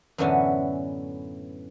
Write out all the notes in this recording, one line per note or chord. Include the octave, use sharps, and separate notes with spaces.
F#2 A2 D3 E3 B3 C#4